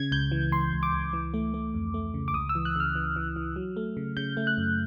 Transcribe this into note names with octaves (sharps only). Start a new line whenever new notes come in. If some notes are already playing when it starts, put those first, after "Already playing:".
Already playing: C#3 G#6
C#2 G6
E3
C#2 C6
C#2
D6
C#2
E3
A3
A3
F2
A3
C#3
D6
C#2 D#6
E6
E3
F#6
C#3 F6
E3
E3
E3
F#3
A3
C#3
C#3 G6
A3
F#6
F#2